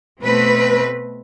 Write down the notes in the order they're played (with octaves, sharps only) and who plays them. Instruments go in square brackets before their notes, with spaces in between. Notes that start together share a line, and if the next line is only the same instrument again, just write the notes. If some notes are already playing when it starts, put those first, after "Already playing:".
[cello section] B2 A3 C4 B4